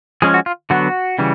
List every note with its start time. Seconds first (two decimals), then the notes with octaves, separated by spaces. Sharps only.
0.22 F3 G#3 C#4 G#4
0.34 F#4
0.46 F4
0.70 D3 F#3 B3 F#4
1.19 C#3 E3 G3